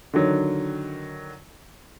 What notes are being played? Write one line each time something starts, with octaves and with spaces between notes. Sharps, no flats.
D3 D#3 F#3